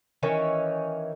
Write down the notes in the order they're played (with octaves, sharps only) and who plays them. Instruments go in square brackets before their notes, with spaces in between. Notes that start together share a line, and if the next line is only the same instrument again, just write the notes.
[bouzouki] D#3 E3 C#4